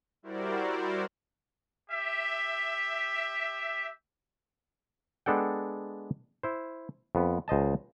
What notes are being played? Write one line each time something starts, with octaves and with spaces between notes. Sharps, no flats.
G3 E4 F#4 A#4 C5 D5
G4 E5
G#3 B3 D4 A4 F#5 G5
E4 C5
F2 B3
C#2 C5 D#5 A5